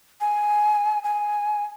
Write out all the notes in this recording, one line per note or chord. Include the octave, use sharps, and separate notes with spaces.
G#5
G#5